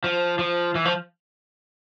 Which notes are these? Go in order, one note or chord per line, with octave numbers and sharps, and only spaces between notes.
F3
F3
E3
F3